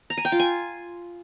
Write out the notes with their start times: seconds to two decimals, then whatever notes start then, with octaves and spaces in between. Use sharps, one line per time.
0.10 A#5
0.17 G#5
0.25 G5
0.32 F4
0.39 G#5